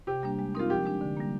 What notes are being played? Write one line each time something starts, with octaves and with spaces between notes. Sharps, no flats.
C3 G4
G3 A#3 D4
G#3
C4 D#4 F4 A#4
F3 G4
G#3 D4
D3
G3 A#3